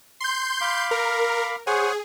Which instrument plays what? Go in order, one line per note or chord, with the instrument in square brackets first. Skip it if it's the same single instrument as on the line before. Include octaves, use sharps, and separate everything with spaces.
[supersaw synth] C6 G6
[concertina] F5 B5 D6
[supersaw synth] A#4
[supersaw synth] G#4 [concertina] C5 C#5 F#5